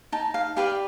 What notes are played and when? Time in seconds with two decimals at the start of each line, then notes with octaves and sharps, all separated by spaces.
0.12 D#4 A5
0.34 F5
0.57 G4 B4 D5 F5